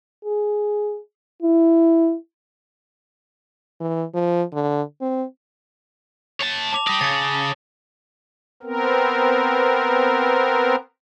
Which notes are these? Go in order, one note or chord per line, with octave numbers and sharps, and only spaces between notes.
G#4
E4
E3
F3
D3
C4
C#5 A5
A5 D6 F7
G4 D5 D#6 A#6
C#3 A6 C#7
A5
B3 C4 A#4